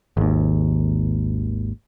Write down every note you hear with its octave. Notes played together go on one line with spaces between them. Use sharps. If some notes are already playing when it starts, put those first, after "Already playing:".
G#1 D#2